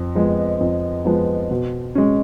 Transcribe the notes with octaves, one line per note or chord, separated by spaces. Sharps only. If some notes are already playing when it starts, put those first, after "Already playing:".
Already playing: F2
F3 G#3 B3
F2
F3 G#3 B3
B2
G#3 C#4